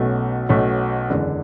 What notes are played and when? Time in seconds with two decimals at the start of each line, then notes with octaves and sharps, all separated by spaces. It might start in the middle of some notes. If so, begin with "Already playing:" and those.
Already playing: B1 B2 A3 C#4
0.49 B1 B2 A3 C#4
1.10 F#1 E2 D3 G#3 D4